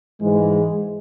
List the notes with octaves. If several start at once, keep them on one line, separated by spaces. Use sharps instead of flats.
G#2 E3 G#3